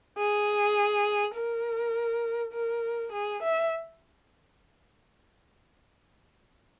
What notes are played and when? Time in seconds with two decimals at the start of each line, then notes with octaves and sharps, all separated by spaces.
0.18 G#4
1.36 A#4
2.54 A#4
3.12 G#4
3.43 E5